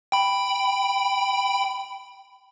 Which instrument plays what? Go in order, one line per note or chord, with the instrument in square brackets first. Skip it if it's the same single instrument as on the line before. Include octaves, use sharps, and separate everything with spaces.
[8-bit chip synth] G5 B5